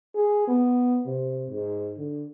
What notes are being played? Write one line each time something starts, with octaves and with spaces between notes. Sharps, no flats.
G#4
B3
C3
G#2
D3